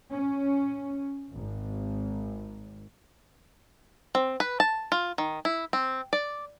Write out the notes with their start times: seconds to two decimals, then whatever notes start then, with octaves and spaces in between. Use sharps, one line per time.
0.11 C#4
1.33 G#1
4.15 C4
4.40 B4
4.60 A5
4.92 F4
5.18 D#3
5.45 E4
5.73 C4
6.13 D5